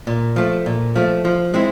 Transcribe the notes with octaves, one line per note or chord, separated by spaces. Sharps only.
A#2
F3 A3
A#2
F3 A3
F3
G#3 C4 E4